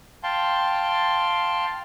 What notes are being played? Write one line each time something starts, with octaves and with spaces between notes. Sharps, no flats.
F5 G5 A5 C6